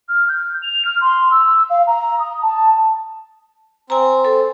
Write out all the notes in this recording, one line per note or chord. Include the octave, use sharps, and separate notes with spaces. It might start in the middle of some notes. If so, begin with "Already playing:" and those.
F6
G6
F7
F6
C6
E6
F5
A#5
D#6
A5
C4 G#5 A#5
A4